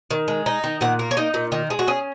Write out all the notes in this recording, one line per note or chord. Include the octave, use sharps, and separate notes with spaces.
D#3
G#3
D#4
D#3
A#2 F#5
A#3
C#5
D#4 D#5
A#2
D#3
G#3
F#4
C#4 G#4